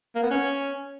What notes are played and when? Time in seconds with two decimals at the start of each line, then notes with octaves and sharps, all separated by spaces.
0.15 A#3
0.23 B3
0.30 C#4